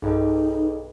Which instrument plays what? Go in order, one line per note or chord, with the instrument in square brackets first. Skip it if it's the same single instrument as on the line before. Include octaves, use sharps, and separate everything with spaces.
[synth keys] B1 G2 [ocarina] D#4 [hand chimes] G#4 A4 D#5